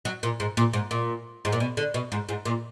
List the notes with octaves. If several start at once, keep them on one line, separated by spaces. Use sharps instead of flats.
F#3
A#2
G#2
A#2
G#2
A#2
G#2
A#2
B2
D3
B2
G#2
G#2
A#2